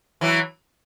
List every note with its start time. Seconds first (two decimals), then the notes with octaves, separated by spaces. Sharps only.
0.21 E3 F#3